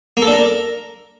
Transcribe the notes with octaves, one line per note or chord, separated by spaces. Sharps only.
A#3
A4
D4
A#4